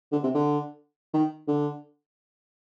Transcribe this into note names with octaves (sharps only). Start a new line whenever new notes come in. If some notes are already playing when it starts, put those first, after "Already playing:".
D3
C3
D3
D#3
D3